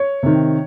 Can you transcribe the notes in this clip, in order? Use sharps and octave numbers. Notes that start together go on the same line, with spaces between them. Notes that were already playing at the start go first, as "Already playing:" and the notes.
Already playing: C#5
C3 D#3